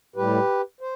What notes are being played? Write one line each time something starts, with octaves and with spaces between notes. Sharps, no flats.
A2 G3 G4 B4
C5